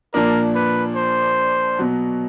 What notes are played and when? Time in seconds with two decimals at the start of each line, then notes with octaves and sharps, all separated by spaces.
0.14 A#2 F3 A#3 D4 A#4
0.55 B4
0.96 C5
1.79 B2 F#3 B3